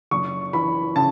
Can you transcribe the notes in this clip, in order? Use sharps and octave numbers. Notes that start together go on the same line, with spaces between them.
F#1 C#6
E3 B5
C#3 A5